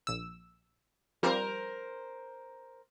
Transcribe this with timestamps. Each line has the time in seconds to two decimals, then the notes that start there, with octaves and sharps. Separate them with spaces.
0.07 A#1 E6
1.23 F3 G3 C4 A#4 C5